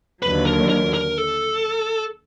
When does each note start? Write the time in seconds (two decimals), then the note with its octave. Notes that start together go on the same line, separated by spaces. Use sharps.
0.22 D#2 D3 F#3 B4
0.46 A#4
0.69 A#4
0.94 A#4
1.18 A4